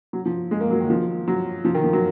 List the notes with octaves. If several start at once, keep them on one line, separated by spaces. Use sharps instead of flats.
F#3
F3
G#3
A#3
F#3
D#3
F3
F#3
F3
D#3
F3
F#3